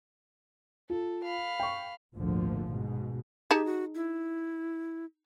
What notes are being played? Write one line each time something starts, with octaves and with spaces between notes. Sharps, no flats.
F4 A4
F5 B5
G5 C#6
G#1 D2 A#2 D3 F3
G#2 B2
D#4 G4 G#4 A5
F#4
E4